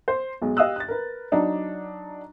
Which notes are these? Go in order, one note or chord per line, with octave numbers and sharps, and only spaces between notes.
C5
B1 G#3
G4 D#5 F5 D#6 E6 F#6
F#6 A6
A#4 B4
F#3 D4 D#4